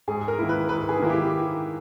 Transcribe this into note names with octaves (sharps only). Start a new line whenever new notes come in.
G#2 G#4
A#4
D#3 A#3 E4
B4
G#2 B4
G#4
D#3 A#3 E4
G4